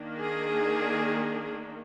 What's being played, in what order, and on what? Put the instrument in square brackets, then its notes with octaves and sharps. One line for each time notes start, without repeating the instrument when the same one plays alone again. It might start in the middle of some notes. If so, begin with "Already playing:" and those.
Already playing: [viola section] D#3 A#3 D4
G#4